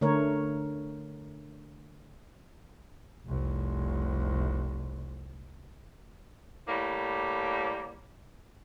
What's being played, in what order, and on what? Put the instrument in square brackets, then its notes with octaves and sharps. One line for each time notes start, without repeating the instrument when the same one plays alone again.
[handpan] D3 A3 A#4 C#5
[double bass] F1 C2
[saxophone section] A2 G3 A#3